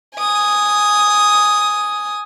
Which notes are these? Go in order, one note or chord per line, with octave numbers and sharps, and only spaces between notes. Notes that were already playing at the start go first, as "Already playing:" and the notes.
G#5 D#6